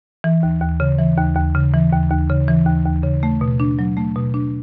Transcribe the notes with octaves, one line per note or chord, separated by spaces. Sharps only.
E3
D#2
D#2
C#3
E3
D#2
D#2
C#3
E3
D#2
D#2
C#3
E3
D#2
D#2
C#3
A3
B2
D4
F#3
A3
B2
D4